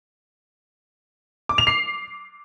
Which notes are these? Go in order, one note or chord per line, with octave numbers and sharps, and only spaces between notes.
D6
F7
C7